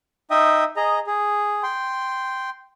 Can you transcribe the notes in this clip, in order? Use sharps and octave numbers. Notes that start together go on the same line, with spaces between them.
D#4 D#5 E5 G5 D#6
G#4 D#5 A#5
G#4
G5 C6